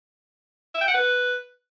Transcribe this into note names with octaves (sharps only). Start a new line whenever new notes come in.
E5
G5
F#5
B4